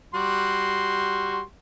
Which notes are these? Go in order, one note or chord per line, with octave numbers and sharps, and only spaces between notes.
G3 F#4 C6